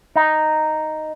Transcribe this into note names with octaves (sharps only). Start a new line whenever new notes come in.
D#4